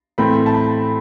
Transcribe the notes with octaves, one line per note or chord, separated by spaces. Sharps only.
A2 E3 A3 C4 B5
A5
B5